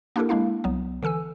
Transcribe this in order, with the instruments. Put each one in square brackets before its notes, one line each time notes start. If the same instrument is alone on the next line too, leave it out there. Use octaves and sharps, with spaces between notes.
[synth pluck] A#3 D4 E4 G4 A4 A#4
G#3 A#3 D4 E4 F5
C2 F#3 B3
D3 E3 A4 G#5 E6